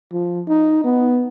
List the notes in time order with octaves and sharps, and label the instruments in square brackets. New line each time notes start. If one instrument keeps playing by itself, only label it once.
[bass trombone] F3
D#4
B3